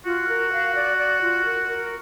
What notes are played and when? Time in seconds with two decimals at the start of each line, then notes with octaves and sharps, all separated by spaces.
0.05 F4 F#4
0.28 A#4
0.52 F5
0.75 D5
0.98 D5
1.22 F4
1.45 A#4
1.68 A#4